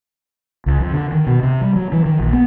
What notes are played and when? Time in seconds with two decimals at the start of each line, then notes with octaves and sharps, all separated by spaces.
0.66 C#2
0.80 F2
0.93 D3
1.12 D#3
1.27 B2
1.43 C3
1.61 G3
1.76 F#3
1.92 E3
2.05 D#3
2.19 A#1
2.33 B3